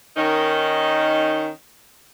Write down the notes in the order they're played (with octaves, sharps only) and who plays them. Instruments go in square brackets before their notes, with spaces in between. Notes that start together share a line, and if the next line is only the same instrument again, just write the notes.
[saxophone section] D#3 C#4 D#4 A#4 D#5